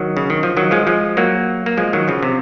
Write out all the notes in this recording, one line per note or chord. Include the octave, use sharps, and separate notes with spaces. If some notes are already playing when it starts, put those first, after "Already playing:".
Already playing: D#3 F#3
C#3
D#3
F3
D#3 F#3
F3 G#3
F3 G#3
F#3 A#3
A#3
F3 G#3
D#3 F#3
C#3 F3
C3